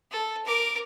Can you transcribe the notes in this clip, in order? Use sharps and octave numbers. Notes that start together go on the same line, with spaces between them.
A4
A#4 D6